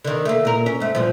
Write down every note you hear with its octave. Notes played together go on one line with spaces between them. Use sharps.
D3 D#3
A3 A#3
A#2 A#4
C#4
G#2 A3
G2 A#2 F3